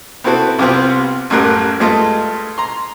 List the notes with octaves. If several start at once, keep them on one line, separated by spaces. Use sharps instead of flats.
B3 C4 E4 F#4 A4 B4
C2 C3 B3 C4 F4
A1 F#2 G3 A3 A#4 F#6
G2 G#3 A3 F4 D#5
A#5 C6